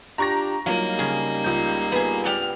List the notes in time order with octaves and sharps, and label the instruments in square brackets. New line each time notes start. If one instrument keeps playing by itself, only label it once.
[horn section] D4 F4 G4 [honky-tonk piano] A#5 C#6 A#6
[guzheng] F#3 [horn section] G3 D#4 [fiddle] A#3 [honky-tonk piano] F4
[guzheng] C#3 G#4
[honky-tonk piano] C#2 G6
[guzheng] B3 G#4
[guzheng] G4 D5 F#5 [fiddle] F6